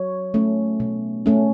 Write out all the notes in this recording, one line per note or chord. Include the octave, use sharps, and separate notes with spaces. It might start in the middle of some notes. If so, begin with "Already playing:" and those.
Already playing: F#3 C#5
A3 C#4
B2
A3 C#4